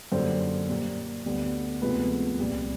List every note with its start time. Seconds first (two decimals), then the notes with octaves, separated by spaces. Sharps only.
0.12 F#2 D3 G3 A#3 C5
0.69 A#2 G3 A#3
1.26 D2 D3 G3 B3
1.82 D2 C3 F3 G#3 B3 B4
2.38 C2 A#2 G3